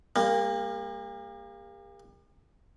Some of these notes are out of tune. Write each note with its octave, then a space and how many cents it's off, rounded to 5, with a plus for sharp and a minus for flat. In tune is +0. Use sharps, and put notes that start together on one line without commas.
G3 +40 A#3 +0